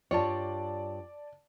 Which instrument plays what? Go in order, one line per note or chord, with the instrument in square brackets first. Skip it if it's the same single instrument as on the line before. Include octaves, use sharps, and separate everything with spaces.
[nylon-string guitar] G2 F4 C#5 [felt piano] D5 A5